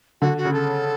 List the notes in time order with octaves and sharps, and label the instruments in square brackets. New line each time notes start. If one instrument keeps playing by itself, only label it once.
[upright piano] D3 [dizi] F#4
[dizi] F#4
[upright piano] C#3
[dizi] A4